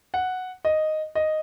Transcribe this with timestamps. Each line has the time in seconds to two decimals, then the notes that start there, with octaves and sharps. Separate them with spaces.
0.14 F#5
0.65 D#5
1.15 D#5